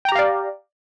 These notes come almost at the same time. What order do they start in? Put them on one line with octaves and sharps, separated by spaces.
G5 A#5 G4 F5 D5